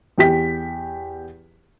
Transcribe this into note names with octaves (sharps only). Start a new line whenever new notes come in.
E2 G4 B6